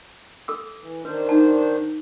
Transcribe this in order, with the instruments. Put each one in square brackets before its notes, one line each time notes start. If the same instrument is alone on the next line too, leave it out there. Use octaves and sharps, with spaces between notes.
[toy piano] A4 D6 E6
[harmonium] E3
[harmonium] D#3 D4 C5 [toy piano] B4
[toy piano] D#4 A5